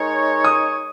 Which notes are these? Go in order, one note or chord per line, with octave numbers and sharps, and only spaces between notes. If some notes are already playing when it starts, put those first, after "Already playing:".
Already playing: G#3 D#4 A#4 C#5
D#6